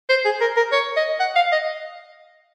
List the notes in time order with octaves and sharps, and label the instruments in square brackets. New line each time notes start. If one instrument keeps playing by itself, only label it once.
[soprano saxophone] C5
G#4
A#4
A#4
C#5
D#5
F#5
F5
D#5